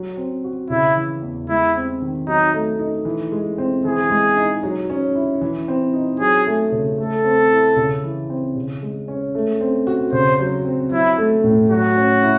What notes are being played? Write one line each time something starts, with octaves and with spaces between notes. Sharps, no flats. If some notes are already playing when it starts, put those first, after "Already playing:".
Already playing: F#3
C4
F#4
C#3 E4
E3
E2
G#3 E4
C4
D#3
F#3 D#4
A3
D#4
E3
G#3
C4
E3 G#4
G#3
D#4
F#3
C#4
E4
E3
C4
D#4
F#3 G#4
A3
C#3
A3 A4
C4
E4
C#3
E3
C4
C#3
G#3
C#4
A3
C4
F#4
C#3 C5
F#3
C4
F#3 E4
A3
A2
F#3 F#4
C#4
E4